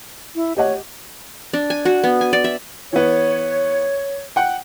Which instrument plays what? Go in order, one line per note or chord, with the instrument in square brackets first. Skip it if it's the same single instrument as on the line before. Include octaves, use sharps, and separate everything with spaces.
[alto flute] E4
[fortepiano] G4 D#5 F#5 [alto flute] C#5
[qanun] D4
G#5
F#4
B3
G#5
D5
E5
[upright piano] E3 B3 [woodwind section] C#5
[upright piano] F#5 G5